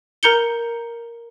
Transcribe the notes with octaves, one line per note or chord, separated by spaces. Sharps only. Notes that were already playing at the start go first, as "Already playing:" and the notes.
A#4 A#5 G6 C#7 G7